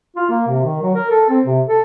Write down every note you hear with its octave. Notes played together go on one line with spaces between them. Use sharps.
F4
A#3
C3
D#3
F#3
A#4
A4
C4
C3
A4